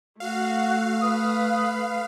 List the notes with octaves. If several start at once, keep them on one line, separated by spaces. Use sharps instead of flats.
A3 F#4 F5
B4 D#6